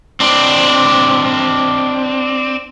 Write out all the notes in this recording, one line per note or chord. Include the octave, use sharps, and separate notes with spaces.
C4 D4